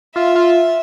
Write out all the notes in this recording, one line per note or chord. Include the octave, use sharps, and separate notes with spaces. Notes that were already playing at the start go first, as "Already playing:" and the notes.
F4 E5
F4